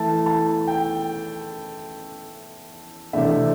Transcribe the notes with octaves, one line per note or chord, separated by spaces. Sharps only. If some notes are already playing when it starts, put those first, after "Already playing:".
Already playing: E3 A3 E4 A5
A5
G5
C3 E3 A3 D4 E5